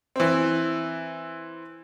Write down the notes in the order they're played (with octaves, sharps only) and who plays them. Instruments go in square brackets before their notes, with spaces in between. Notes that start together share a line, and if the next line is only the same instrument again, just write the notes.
[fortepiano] E3 C4